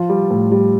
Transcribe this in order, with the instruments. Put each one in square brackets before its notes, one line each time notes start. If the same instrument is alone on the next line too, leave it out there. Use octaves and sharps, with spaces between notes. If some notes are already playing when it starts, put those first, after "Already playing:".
Already playing: [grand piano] F3 F4
G3
A2
G3